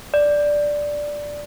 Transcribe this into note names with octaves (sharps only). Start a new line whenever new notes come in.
D5